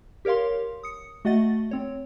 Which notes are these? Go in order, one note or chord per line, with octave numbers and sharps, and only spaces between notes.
G4 A#4 C#5 F5 C6
D#6 C#7
A3 F#4 D#5 F#5 A6
C4 C#5